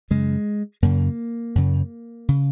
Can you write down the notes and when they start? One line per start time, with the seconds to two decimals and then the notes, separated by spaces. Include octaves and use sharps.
0.10 F#2 C#3 G#3
0.82 F#2 C#3 A#3
1.55 F#2 C#3
2.29 C#3